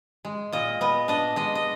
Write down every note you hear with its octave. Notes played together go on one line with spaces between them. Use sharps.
G#3
A#2 D#5
B3 D#5
D4 D#5
G#3 D#5
D#5